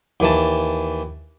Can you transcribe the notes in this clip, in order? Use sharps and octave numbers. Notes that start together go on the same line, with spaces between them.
D#2 E3 A5